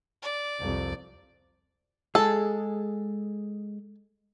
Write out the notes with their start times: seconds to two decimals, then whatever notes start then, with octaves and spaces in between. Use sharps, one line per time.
0.22 D5
0.60 C2 F2
2.15 G#3 G#4 A4